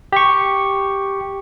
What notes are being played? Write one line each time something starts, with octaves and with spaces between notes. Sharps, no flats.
G4 C#6